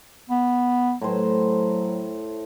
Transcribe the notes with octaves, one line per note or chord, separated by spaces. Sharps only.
B3
A2 F#3 C5